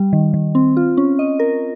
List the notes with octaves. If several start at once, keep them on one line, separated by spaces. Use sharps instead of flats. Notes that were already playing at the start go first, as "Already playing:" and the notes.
Already playing: G3
D#3
D#3
C4
F4
C#4
D#5
A#4